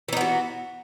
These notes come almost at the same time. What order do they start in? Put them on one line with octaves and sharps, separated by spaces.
E3 D#4 B3 F#4